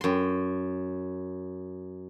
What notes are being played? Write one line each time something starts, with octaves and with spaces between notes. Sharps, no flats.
F#2 C6